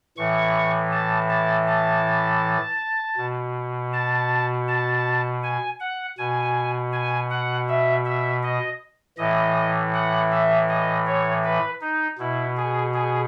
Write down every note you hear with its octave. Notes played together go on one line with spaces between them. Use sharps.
A2 E3 C#6
A5
A5
A5
B2
A5
A5
G#5
F#5
B2 G#5
G#5
F#5
E5
E5
D#5
A2 E3 D#5
F#5
E5
D#5
C#5
B4
D#4
B2 E4
G#4
G#4